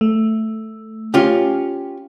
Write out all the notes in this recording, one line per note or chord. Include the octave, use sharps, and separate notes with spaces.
A3
C#4 F4 G4